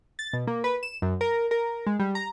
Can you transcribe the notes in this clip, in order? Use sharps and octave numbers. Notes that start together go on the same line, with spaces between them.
A6
B2
A#3
B4
E7
F#2
A#4
A#4
G#3
G3
A#5